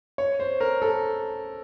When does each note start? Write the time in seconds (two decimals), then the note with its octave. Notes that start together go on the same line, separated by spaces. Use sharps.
0.18 C#5
0.40 C5
0.60 A#4
0.82 A4